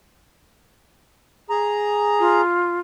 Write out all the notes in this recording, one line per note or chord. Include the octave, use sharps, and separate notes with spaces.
G#4 A#5
F4